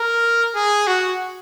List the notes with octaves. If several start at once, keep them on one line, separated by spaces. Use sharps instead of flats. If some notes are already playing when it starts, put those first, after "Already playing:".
Already playing: A#4
G#4
F#4